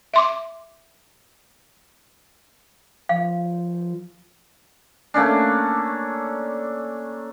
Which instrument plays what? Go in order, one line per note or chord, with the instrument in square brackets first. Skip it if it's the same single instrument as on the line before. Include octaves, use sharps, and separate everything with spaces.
[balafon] E5 C6 D6
[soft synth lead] F3 [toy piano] F5
[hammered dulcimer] A3 A#3 C#4 D4